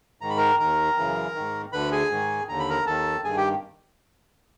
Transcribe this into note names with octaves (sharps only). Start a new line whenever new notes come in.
G#2 D#3 A#5
B5
A#4 A#5
D#2 D#3 A#4 A#5
F#2 C#3 E3
G#2 D#3
D2 D3 B4 B5
G#4 G#5
G#2 D#3
D#2 D3 A#5
B5
A#4 A#5
D#2 D#3 A4 A5
G2 D#3 G#4 G#5
G4 G5